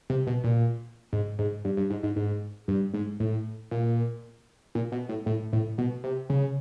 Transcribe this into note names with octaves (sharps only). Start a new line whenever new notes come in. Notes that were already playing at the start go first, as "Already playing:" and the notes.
C3
B2
A#2
G#2
G#2
G2
G2
G#2
G#2
G#2
G2
G#2
A2
A#2
A#2
B2
A2
A2
A2
B2
C3
C#3